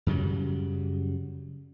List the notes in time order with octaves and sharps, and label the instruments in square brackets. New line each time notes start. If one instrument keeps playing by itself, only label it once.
[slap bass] F#2 C#3 F#3 G3